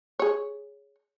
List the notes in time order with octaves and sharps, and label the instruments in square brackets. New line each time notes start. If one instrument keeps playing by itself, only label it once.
[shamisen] G#4 C#5